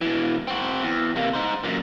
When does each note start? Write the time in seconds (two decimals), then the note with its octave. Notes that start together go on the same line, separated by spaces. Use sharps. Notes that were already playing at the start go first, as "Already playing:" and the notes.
0.01 B2 E3
0.47 C4 F#4
0.82 E2
1.16 C3 A#3
1.33 D#4 C5
1.64 F#2 A#2